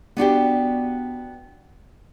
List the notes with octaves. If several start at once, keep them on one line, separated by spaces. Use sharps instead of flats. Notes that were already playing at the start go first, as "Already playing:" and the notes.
B3 D4 F#4 G4